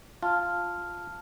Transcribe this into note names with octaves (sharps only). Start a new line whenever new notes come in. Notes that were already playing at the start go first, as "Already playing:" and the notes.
F4 A5 F6